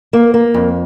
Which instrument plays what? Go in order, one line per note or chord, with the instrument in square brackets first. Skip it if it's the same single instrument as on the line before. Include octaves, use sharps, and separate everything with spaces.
[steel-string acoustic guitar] A#3
A#3
F2